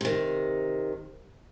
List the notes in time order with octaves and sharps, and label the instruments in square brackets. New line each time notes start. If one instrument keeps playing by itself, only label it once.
[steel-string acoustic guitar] C3 D#3